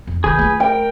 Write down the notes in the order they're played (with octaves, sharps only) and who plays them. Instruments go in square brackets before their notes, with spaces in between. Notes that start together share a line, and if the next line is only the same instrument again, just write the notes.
[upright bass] F2
[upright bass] D#2 C#3 [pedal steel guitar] G#4 B4 G6
[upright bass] A3 F4
[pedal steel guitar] A#4 [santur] G5